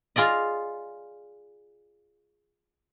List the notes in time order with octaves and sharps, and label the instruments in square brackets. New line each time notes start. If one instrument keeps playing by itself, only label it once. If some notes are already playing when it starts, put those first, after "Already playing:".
[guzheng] F4 G#4 D5 D#5